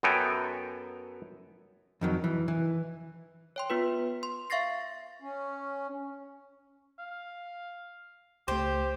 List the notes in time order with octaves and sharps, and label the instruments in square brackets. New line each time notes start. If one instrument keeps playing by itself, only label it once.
[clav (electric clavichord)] F#2 B3 A4 G5 G#5 A#5
[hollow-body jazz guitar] F2 D#3 F#3
E3
E3
[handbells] C#5 G5 C6
B3 F4 B4
C6
E5 F5 C#6 A6 A#6 C7
[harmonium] C#4
[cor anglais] F5
[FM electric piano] C#2 A3 [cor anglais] G4 [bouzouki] C5